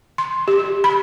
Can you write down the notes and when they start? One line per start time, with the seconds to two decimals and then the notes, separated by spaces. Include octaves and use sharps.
0.18 C6
0.48 G4
0.84 B5